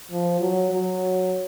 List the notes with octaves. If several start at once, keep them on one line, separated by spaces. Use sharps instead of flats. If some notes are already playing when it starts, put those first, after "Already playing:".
F3
F#3
F#3